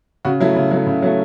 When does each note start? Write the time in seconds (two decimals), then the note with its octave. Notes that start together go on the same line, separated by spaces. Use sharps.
0.25 C#3 F#4
0.40 F#3 A3 E4
0.56 C#3
0.71 F#3 A3
0.87 C#3
1.02 F#3 A3